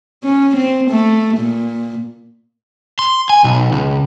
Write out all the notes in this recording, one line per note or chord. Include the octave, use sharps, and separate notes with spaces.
C#4
C4
A3
A#2
C6
G#5
B1
C#2